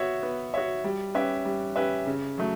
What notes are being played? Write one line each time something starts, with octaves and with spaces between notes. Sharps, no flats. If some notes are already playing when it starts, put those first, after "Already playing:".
Already playing: B3 F#4 C#5 E5
B3
F#4 C#5 E5
G3
C#4 G4 B4 E5
G3
C#4 G4 B4 E5
C#3
F#3 A3